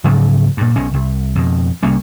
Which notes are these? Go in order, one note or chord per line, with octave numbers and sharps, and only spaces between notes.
G#2 C#3 F#3 A3
G2 A#2
B1 B2 C#4
C2
F2 B2
C2 G3 A#3 C#4